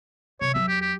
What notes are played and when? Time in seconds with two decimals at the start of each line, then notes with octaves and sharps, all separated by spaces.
0.41 C3 E3 C#5
0.54 E2 F#3 E5
0.69 G4
0.81 G4